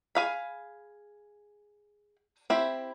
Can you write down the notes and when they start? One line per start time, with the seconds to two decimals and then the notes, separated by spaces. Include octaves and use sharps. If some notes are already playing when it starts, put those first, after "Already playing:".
0.15 G#4 F5 B5
2.50 C4 E4 G4